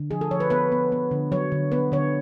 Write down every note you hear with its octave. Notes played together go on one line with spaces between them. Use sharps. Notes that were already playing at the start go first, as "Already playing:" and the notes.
Already playing: D3
F3 G#4
A4
F3 C#5
B4
B3 B4
B3
B3
D3
F#3 C#5
D3
B3 B4
D3 C#5